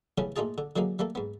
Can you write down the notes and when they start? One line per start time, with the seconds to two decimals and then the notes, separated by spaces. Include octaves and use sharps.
0.18 C#3 E3 G3 A3 B3 C#4
0.36 A#2 A3 D#4 F4 G#4 A5
0.58 D3
0.76 D3 F#3 G#3 A#3 D#4
0.99 G3 A3 A#3 A4
1.15 G#2 B3